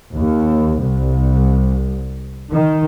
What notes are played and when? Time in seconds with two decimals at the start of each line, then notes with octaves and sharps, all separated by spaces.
0.15 D#2
0.82 C2
2.52 D#3